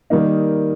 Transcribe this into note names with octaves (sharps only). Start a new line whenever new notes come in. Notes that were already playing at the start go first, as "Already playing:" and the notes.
D#3 G3 A#3 D#4